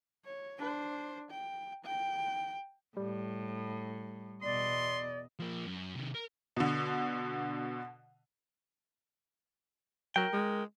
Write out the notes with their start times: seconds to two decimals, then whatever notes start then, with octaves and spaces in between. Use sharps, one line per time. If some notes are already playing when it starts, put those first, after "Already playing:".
0.24 C#5
0.58 D4 C5
1.30 G5
1.85 G5
2.97 A2 G3
4.43 E2 B2 D5 D#5 C6
5.39 F3 A#3
5.66 F#2
5.95 C3 D#3
6.14 A#4
6.57 B2 D3
10.16 F#3 A#4 G5
10.33 G#3